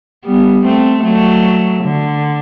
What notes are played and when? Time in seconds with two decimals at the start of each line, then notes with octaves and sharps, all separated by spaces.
0.25 G3 B3
0.64 A3 C4
1.04 F#3 A3
1.84 D3